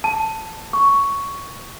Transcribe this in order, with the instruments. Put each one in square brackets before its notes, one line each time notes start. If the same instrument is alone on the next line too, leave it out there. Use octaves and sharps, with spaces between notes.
[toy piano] A5
C#6